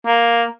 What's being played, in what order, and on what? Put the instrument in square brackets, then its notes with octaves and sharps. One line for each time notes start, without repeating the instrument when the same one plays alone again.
[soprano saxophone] A#3